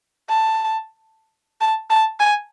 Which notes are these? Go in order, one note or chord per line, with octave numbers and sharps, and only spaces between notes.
A5
A5
A5
G#5